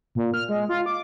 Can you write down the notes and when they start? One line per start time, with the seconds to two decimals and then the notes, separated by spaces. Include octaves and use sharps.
0.15 A#2
0.34 F6
0.49 G#3
0.69 F4
0.86 D6